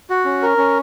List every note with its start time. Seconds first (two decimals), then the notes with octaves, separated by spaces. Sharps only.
0.10 F#4
0.25 C#4
0.42 A#4
0.57 C#4